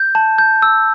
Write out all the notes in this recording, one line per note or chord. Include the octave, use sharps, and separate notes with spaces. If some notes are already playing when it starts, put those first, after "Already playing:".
Already playing: G6
A5
G6
E6